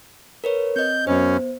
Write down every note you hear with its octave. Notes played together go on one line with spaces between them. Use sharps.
A#4 B4 C#5
C4 D#5 G6
F#2 B3 C#4 C5